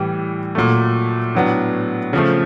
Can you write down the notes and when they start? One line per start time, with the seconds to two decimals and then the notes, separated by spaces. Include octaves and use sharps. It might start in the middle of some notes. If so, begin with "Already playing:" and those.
Already playing: A2 E3 G3
0.55 A#2 F#3 A3
1.35 A2 F#3 B3 D4
2.13 C#3 F3 A3